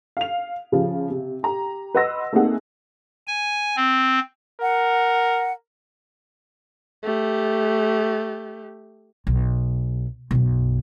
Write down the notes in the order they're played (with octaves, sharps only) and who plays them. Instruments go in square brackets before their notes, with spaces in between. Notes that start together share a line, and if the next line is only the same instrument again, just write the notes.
[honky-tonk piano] F5 F7
C#3 F3
C3
G4 A#5
B4 D#5 F#5 C6 E6 A#6
A3 A#3 C4 D#4 G#4 F#5
[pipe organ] G#5
C4
[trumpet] A#4 [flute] F#5
[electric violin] A3 G4
[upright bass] B1
B1 F#2